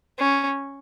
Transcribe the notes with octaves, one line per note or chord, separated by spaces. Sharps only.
C#4